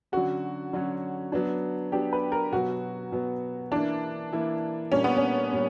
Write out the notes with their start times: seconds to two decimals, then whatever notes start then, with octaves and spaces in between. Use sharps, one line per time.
0.12 D3 F#3 C#4 F#4
0.73 D3 F#3 C#4
1.32 F#3 B3 D4
1.92 F#3 B3 D4 G4
2.13 B4
2.32 A#4
2.52 B2 F#3 B3 F#4
3.12 B2 F#3 B3
3.72 E3 A#3 D4 E4
4.32 E3 A#3 E4
4.92 A#2 G3 A#3 C#4 D4
5.04 B3
5.17 C#4
5.52 A#2 G3